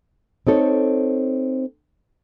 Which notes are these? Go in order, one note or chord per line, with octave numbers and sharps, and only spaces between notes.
C4 D#4 A4 C#5